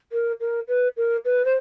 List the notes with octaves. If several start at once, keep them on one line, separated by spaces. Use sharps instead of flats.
A#4
A#4
B4
A#4
B4
C5